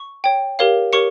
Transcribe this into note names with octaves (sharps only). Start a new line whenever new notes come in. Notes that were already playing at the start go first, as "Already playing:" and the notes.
Already playing: C#6
C#5 G5
G4 A#4 C#5 F5
G4 A#4 C#5 C#6 C#7